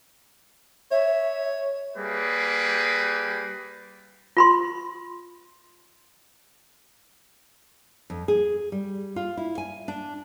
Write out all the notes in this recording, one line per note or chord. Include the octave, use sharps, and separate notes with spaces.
C#5 E5
G3 A#3 G#4 B4
F4 B5 C6
F2
G#4
G3
F4
E4
G#5
D4